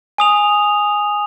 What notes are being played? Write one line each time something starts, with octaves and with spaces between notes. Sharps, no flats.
G#5 D#6 F7